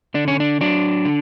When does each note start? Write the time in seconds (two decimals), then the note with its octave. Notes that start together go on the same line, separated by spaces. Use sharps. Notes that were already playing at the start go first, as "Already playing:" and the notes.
0.14 D3 D4
0.28 C#4
0.40 D4
0.61 F#3 D4
1.05 D3